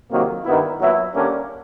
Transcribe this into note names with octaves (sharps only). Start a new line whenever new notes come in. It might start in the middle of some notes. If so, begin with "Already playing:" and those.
F2 C3 D#3 F#3 A#3
G2 D#3 G3 B3 E4
A#2 F#3 B3 E4
D3 G3 A#3 C#4